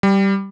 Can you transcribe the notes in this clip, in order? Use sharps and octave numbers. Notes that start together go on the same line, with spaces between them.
G3